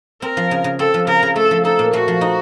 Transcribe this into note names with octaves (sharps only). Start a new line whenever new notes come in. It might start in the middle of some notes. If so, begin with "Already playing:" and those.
C4 A#4
F3
C#3
C#3
C4 A4
F3
C#3 A#4
C#3
A3 A4
F3
D#4 A4
A#2
A3 F#4
F3
D#4